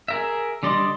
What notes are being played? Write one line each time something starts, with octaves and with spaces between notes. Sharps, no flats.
G#4 A#4 E5
D3 G3 D5 D#5 C6